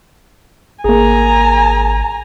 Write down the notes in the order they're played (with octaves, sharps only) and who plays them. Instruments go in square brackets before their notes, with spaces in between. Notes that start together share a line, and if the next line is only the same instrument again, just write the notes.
[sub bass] G#1 [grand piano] A#3 G#4 [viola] G#5 A#5